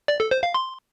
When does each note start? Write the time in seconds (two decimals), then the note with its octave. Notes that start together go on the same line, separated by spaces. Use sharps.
0.08 D5
0.20 A4
0.31 C5
0.43 F5
0.54 C6